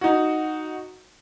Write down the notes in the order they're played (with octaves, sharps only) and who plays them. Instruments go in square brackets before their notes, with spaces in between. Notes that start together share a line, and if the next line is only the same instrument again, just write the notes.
[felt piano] D#4 F#4